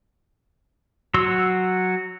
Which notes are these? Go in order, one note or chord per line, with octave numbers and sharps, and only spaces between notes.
F#3 F#4 C6 E6